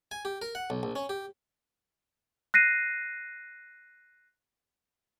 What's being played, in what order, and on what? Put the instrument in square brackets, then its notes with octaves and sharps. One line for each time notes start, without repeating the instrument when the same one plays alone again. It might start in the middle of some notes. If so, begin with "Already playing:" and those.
[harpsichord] G#5
G4
A#4
F#5
B1
A#1
C#4
G4
[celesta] F#6 A#6 C7 D#7